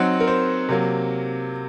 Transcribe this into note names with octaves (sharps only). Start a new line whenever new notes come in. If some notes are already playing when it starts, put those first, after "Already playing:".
Already playing: F#3 C4 D#4 F#5
A#4
C5
C3 F#3 A#3